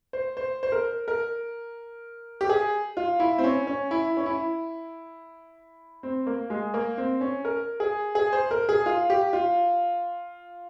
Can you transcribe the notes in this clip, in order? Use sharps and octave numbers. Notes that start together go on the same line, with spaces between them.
C5
C5
C5
A#4
A#4
G4
G#4
F4
E4
C4
C#4
C#4
E4
C#4
E4
C4
A#3
G#3
A#3
C4
C#4
A#4
G#4
G#4
C5
A#4
G#4
F4
G4
F4